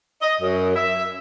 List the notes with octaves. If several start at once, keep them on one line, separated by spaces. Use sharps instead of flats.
D#5
F#2
E5